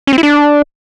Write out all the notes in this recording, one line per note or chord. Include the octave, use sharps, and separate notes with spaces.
C#4
C4
E4
D4